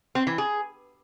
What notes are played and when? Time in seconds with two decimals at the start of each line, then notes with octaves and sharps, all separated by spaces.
0.15 C4
0.27 E3
0.38 G#4